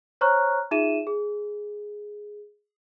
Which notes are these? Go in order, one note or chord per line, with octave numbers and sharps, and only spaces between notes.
C5 C#5 A#5 C#6 F6 F#6
D#4 F4 G#4 E5 D#7 E7
G#4